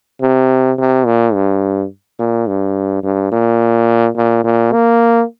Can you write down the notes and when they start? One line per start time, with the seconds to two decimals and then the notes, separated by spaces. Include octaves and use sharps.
0.22 C3
0.78 C3
1.06 A#2
1.34 G2
2.19 A#2
2.48 G2
3.03 G2
3.32 A#2
4.17 A#2
4.44 A#2
4.72 A#3